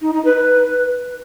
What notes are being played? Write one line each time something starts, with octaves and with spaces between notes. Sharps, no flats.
D#4
D#4
B4
B4